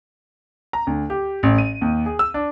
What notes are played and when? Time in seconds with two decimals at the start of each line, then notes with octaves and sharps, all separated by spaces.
0.73 A#5
0.87 D2
1.10 G4
1.43 A1
1.58 D#7
1.81 D#2
2.06 G#4
2.19 E6
2.34 D4